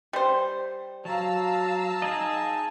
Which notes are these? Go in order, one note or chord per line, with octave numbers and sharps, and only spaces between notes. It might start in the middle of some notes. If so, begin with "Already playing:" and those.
G3 C5
F#3 F5 A5 A#5 E6
D#4 G#4 D#5